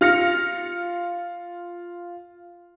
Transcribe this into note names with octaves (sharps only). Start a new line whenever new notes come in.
F4 F6 A#6 C#7